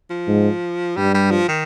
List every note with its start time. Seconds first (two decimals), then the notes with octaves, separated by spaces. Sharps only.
0.10 F3
0.28 G#2
0.97 G2 G3
1.14 G3
1.31 F3
1.48 D#3